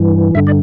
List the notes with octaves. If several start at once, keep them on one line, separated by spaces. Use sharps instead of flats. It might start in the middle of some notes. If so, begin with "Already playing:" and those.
Already playing: G2 E3
G2 D3 E5
D5